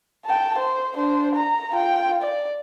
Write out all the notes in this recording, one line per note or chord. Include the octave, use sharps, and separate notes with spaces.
G5 A5
C5
D4 C5
A#5
F4 G5
D5